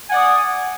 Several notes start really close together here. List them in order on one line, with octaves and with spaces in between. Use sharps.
G#5 F#5 D5 D#6